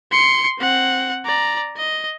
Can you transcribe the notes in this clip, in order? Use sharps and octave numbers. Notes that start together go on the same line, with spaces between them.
C6 C#7
C4 F#5
D5 A#5
D#5